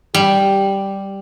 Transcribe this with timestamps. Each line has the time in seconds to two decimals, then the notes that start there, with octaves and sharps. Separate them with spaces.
0.15 G3 G4